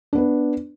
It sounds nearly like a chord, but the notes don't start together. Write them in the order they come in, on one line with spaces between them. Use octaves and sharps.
D4 B3 B4